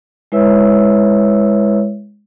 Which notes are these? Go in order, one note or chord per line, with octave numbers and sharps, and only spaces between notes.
G#3 E4 B4 C#5 E5 E6